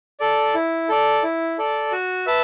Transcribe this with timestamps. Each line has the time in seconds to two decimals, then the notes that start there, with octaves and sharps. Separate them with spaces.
0.20 A4 D5
0.54 E4
0.89 A4 D5
1.23 E4
1.58 A4 D5
1.92 F#4
2.26 B4 E5 A5